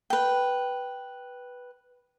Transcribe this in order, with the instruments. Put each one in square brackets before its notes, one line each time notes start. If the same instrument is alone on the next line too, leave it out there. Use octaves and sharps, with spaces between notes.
[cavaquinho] B4 G5